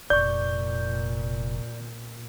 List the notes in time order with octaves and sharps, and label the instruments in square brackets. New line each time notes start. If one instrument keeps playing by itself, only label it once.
[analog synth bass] F1 [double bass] A#2 [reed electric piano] D5 C#6 [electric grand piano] G6